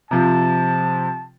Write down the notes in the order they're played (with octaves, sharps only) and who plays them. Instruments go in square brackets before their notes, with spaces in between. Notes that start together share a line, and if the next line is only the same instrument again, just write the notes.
[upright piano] C3 F3 [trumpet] A5